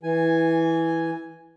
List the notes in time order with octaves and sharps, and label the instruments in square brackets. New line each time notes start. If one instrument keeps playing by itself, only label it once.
[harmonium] E3 G#5